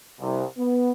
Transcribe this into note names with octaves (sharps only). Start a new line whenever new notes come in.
C2
B3